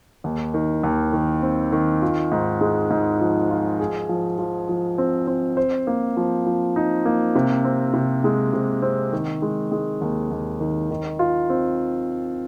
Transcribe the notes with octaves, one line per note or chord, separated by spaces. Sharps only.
D#2
D#3
D#2
D#3
C4
D#3
F4
G#2
G#3
G#2
F3
F4
G#4
F3
F3
F3
C4
C4
C5
A#3
F3
F3
D#4
A#3
C3
C4
C3
G#3
C3
C4
D#3
G#3
G#3
D#2
D#2
D#3
D#3
F4
C4